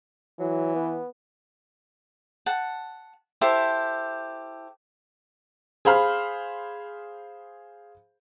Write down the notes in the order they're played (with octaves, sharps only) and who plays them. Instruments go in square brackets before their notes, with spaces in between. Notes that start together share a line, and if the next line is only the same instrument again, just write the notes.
[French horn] E3 [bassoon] F#3
[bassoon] B3
[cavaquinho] F#5 A5
E4 G4 A4 C5
[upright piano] G#4 C5 F5 B5 F6